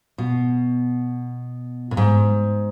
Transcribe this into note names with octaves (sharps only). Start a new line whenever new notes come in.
B2
A2
G#2